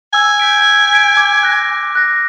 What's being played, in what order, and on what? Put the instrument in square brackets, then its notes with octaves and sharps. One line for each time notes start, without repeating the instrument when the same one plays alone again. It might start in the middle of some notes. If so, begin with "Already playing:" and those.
[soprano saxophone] G#5 [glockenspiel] E6
[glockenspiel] G6 B6 D7
E6
G6 B6 D7
D6
F#6 A#6
D6
F#6 A#6